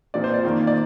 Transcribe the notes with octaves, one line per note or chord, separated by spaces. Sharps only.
A#2 F3 C4 D5
C5
D5
F2 D#3 A#3
D5